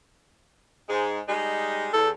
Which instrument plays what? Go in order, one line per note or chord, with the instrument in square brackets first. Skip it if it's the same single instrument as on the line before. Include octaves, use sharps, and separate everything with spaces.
[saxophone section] G#2 G#3
G3 G#3 D#4
[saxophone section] E2 [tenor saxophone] A4